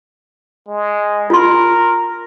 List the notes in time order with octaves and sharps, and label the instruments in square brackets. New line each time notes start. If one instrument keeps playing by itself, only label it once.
[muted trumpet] G#3
[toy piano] F4 C6 [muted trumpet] A#4